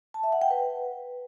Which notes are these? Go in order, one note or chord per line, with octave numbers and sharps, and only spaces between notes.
A5
E5
F#5
G5
B4